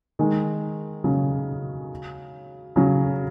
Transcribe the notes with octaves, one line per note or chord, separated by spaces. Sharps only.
D#3 G#3
C#3 F#3
C#3 F#3